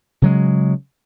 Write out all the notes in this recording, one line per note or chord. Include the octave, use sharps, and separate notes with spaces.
C#3 F#3 G#3